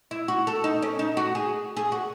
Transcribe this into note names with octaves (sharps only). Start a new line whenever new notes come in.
E4
F#4
A4
D#4
C#4
D#4
F#4
G#4
G#4
F#4